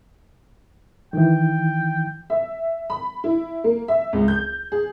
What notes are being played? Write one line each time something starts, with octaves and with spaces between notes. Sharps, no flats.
D#3 E3 G5
E5
B5
E4
A#3
E5
C#2
G6
G#4